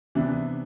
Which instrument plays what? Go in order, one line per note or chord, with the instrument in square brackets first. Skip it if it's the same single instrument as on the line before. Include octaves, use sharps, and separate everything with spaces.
[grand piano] C3 E3 B3 D4